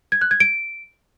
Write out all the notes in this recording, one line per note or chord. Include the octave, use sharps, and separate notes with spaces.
G#6
F#6
G#6
D7